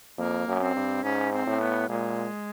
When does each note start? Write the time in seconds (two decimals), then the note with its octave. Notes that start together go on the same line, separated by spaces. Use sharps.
0.18 F2 A#3
0.47 F#2
0.61 C4
0.76 G2
1.03 G#2 C#4
1.33 C4
1.46 A2
1.61 B3
1.89 A#2 G#3